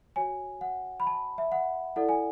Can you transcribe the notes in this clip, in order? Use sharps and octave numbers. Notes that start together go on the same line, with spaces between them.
F#4 C#5 G#5
F#5
B5
A5
E5
F#5
E4 A4 D5 F#5
G#5